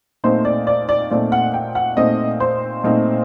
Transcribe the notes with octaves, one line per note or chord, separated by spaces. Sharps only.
A#2 A3 C4 D#4 C5
D5
D5
D5
A#2 A3 C4 D#4 D5
F#5
G5
F#5
A#2 A3 C4 D#4 D#5
C5
A#2 A3 C4 D#4